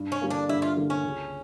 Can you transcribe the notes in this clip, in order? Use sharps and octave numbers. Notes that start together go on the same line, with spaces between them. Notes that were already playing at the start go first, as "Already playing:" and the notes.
Already playing: G2
C#4
D3 G3 A#3
D4
G2 E4
F4
D3 G3 A#3
C#4
C#2